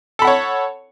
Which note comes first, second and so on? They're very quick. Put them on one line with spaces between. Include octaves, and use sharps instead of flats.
A4 B5 F#5 C#5